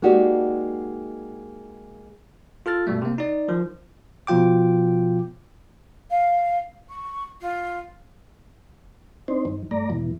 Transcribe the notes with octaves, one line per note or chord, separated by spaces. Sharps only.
G#3 A#3 D#4 F#4 G4 D5
F4 A4 F6 A6
G2 B2 G3 A3
C3 A#3
D#4 D5
D#3 F3
B2 F3 F4 G5 D6
F5
C#6
F4
C4 D4 D#4 C5
G2 D#3
G2 A3 D5 A#5
E2 G#2 B2 E3